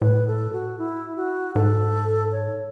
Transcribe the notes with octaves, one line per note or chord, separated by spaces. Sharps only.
A2 B4
A4
F#4
E4
F#4
G#2 A4
C#5